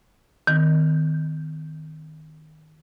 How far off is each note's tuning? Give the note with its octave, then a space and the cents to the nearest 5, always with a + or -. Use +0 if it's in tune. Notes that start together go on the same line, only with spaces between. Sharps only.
D#3 +0 C4 -40